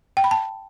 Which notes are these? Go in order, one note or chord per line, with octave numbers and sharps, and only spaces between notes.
G5
B5
A5